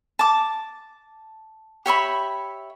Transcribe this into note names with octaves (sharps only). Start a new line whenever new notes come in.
A5 D6
G4 C#5 E5 B5